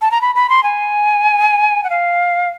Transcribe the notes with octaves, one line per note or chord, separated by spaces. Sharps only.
A5
A#5
B5
B5
C6
G#5
F#5
F5